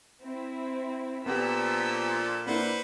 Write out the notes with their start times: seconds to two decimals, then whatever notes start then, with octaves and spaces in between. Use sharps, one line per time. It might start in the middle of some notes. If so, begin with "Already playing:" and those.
0.22 C4 E4
1.26 A#2 F3 B3 D4 G4 A4 E6 B6
2.47 A#3 D4 E4 B4 C5 F#5